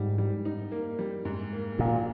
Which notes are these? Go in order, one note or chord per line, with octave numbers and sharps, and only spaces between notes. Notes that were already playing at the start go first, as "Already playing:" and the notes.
Already playing: G#2 G3
G3
D#4
A#3
G3
G#2
A#3
A#2 F3